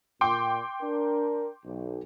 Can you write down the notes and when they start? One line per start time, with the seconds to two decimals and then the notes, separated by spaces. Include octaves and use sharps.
0.21 A#2 G5 C6 D6
0.82 D4 A#4
1.64 B1